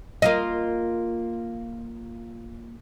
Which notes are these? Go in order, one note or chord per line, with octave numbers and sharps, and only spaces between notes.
A#3 F4 D#5